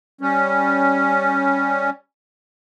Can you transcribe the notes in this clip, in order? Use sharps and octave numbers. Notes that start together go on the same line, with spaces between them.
G3 C#4